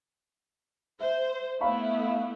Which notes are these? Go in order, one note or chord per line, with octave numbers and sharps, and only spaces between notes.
C5 E5
A3 B3 E4 F5 B5 C#6